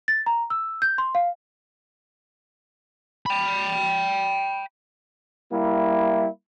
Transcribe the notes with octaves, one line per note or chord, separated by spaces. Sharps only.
A6
A#5
E6
G6
C6
F5
G5 B5
G3 A#3 E4